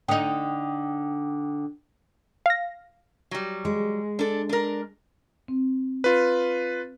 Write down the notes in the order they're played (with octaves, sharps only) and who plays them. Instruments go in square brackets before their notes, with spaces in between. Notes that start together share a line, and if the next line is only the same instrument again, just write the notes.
[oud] D3 D#4 [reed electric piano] G5 D#6
[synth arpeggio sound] F5 A#6
[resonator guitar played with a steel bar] F#3 G3
[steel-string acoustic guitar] G#3
[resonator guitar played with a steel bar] D4 A4
D4 A#4
[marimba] C4
[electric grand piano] F4 B4